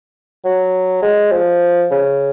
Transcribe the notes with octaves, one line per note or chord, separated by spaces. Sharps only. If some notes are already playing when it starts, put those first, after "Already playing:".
F#3
G#3
F3
C#3